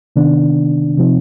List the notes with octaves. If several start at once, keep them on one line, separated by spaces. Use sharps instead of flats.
C3 D#3 B3 D4
C3 F3 C4 D#4